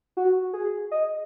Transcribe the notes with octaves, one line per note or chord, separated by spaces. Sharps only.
F#4
G#4
D#5